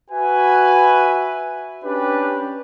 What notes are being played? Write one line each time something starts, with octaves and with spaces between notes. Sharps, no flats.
F#4 B4 E5 G#5
C#4 D4 G4 B4